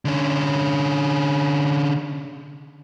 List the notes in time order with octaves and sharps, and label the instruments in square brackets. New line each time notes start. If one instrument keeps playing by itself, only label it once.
[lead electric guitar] D3 C#4